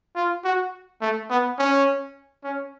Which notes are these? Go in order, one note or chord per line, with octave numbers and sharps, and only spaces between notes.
F4
F#4
A3
B3
C#4
C#4